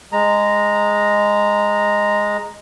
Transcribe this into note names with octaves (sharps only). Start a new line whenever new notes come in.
G#3 A#5